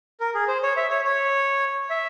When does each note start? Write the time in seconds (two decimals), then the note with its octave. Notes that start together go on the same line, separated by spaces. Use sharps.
0.20 A#4
0.34 G#4
0.48 C5
0.63 C#5
0.77 E5
0.90 C#5
1.05 C#5
1.90 E5